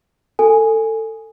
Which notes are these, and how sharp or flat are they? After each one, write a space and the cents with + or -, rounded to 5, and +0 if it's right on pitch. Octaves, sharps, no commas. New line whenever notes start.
A4 +20 G#5 +0